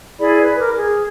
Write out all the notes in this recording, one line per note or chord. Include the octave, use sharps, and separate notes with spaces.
E4 G#4 D5 B5
B4
A#4 D6
G#4